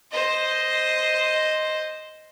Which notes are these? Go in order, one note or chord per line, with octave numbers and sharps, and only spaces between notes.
C5 D#5